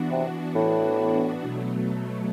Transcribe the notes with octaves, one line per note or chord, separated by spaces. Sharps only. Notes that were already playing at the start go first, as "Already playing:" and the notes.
Already playing: E3 B3 D4 F#4
C3
A2
B2 F#3 A3